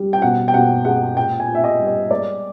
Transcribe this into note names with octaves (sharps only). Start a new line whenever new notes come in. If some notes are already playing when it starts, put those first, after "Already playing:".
Already playing: G3
G5
B2 F#5
G5
B2 F#5
G#3 F#5
A#2 G5
G#5
A#2
E5
D#5
G3
D#5
G#3 D5